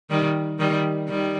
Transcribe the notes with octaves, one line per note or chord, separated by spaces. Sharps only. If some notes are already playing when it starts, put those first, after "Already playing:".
D#3 G3
D#3 G3
D#3 G3